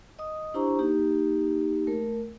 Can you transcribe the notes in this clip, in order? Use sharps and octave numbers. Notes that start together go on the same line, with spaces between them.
D#5 D#6
D4 E4 G4 C5 A#5 C#6
A#3 D#4 G4
A3 A#4